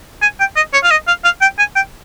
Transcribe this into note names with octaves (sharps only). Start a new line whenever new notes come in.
G#5
G5
D#5
C#5
F5
D#5
F5
F5
G5
G#5
G5